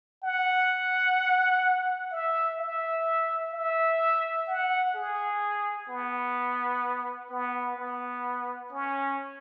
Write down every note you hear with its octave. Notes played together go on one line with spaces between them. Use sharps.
F#5
E5
E5
E5
F#5
G#4
B3
B3
B3
C#4